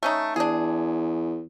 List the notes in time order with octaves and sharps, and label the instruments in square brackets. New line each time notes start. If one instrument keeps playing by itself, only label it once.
[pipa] A3 C#4 D#4
[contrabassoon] E2 [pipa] D4 G#4